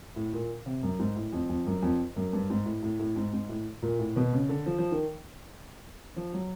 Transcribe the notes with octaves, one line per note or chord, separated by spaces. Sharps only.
A2
A#2
C3
F#2
G#2
A2
F2
F2
F#2
F2
F#2
G2
G#2
A2
A2
A2
G#2
G#2
A2
A#2
A2
B2
C#3
D3
F3
F3
D#3
F3
F#3